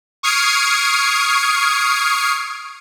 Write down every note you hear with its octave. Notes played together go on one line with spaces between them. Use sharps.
C#6 D#6 F6 G#6 C7 D7